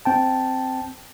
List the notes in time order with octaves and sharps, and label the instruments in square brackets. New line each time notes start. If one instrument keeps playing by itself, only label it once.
[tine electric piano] C4 G5 A5